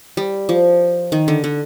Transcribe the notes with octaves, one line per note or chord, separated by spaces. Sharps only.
G3
F3
D#3
D3
D3